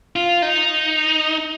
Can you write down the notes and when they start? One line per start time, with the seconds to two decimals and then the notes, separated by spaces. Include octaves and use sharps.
0.16 F4
0.42 D#4